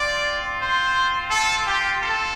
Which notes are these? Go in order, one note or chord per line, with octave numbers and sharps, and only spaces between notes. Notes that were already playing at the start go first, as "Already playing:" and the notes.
Already playing: C4 F4 D5
C5
A4
G4
A4